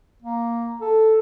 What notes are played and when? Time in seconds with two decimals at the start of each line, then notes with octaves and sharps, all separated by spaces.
0.22 A#3
0.81 A4